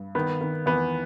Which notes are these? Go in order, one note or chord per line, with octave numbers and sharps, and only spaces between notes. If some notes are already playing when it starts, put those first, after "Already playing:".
Already playing: G2
D#3 B3
D#3
E2 B3